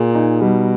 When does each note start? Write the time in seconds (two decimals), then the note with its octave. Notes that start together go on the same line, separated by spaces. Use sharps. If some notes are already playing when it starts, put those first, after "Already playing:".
Already playing: A#2 G#4
0.15 D#4
0.41 B2 G3